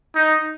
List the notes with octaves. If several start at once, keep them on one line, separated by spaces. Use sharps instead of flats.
D#4